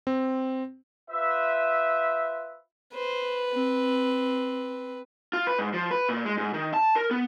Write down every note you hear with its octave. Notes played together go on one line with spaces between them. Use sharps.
C4
F4 B4 C5 E5
B4 C5
C4
F4
B4
G#2
F3
B4
A#2
G#3
G#2
D#3
A5
A#4
B3